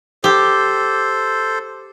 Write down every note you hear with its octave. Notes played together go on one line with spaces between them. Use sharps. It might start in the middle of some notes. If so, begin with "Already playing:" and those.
G4 A4 C5